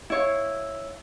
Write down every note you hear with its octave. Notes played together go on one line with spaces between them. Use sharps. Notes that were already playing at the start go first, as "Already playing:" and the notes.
E4 C#5 F5